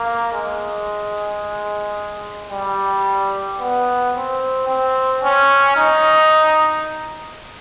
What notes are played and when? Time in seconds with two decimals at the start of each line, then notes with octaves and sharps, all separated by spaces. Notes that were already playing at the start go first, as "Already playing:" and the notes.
Already playing: A#3
0.33 G#3
2.51 G3
3.60 B3
4.15 C4
4.68 C4
5.23 C#4
5.77 D#4